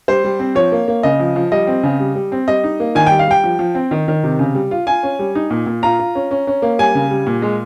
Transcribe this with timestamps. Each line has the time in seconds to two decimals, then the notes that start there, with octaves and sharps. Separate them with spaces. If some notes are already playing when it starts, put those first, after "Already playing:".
0.08 G3 C5
0.24 G3
0.39 C4
0.55 F3 C#5
0.72 A#3
0.88 A#3
1.03 C#3 D#5
1.20 F3
1.36 F3
1.52 G3 D#5
1.67 C4
1.83 C#3
2.00 G3
2.15 G3
2.32 C4
2.48 G3 D#5
2.64 D#4
2.80 A#3
2.95 D#3 G#5
3.06 G3 G5
3.19 F5
3.27 G3 G5
3.44 F3
3.59 F3
3.75 C4
3.91 D#3
4.08 D#3
4.24 C3
4.39 C#3
4.55 G3
4.71 F4
4.87 F4 G#5
5.03 C#4
5.19 G3
5.35 D#4
5.50 A#2
5.67 A#2
5.83 F4 A#5
5.99 F4
6.15 C#4
6.31 C#4
6.47 C#4
6.62 A#3
6.79 G3 G#5
6.95 C#3
7.11 G3
7.27 A#2
7.42 G#3